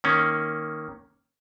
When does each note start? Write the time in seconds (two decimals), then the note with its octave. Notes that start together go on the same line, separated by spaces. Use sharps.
0.04 D#3 A#3 C#4